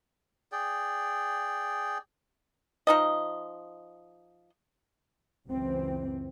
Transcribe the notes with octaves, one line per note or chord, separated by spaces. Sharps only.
G#4 D5 G5
F3 D#4 D#5
C#2 F#2 E3 C4